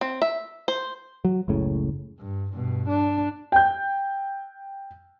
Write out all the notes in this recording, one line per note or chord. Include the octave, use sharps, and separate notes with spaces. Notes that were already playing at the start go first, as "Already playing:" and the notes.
C4
E5
C5
F#3
F#1 C#2 A2 C#3
G2
G2 B2
D4
G5 G6